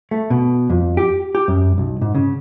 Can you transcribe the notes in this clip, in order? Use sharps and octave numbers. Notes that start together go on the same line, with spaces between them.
A3
B2
F2
G4
G4
F#2
B1
G#2
C#3